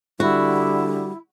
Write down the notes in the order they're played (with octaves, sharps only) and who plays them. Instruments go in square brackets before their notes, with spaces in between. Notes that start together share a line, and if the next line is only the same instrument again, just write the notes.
[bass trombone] D3 [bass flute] G3 [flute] E4 [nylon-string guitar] F#4